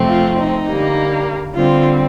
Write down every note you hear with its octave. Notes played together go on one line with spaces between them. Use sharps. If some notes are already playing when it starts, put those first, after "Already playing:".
Already playing: F2 C3 F3 A3 C4
F4
D#4
D3 G3 A#3
D3 G3 C4 F4